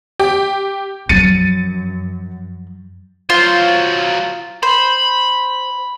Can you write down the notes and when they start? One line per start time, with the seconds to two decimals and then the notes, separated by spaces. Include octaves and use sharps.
0.19 G4
1.09 F#2 F3 F#3 A6 C#7 D#7
3.30 F#3 F4 C5
4.63 C5 B5